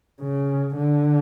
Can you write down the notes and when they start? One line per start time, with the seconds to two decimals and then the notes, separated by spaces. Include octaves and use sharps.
0.22 C#3
0.77 D3